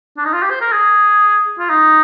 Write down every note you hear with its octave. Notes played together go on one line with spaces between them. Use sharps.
D4
D#4
F4
G4
C5
A#4
G#4
F4
D#4